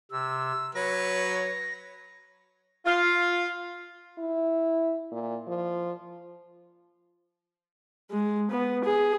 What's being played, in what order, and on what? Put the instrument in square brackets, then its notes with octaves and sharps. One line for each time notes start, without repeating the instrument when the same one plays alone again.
[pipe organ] C3 [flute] E6
[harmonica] F#3 B4 [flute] C#5 [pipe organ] A#6
[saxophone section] F4
[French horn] E4
A#2
F3
[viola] G#3
B3
G#4